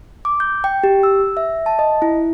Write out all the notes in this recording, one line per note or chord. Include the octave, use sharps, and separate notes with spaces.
D6
G6
G5
G4
E6
E5
A5
D#5
E4